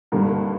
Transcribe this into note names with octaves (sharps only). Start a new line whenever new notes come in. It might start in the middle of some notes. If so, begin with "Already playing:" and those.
G#1 G2 D3 G3 A#3